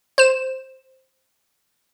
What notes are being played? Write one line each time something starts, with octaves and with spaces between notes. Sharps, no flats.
C5 E7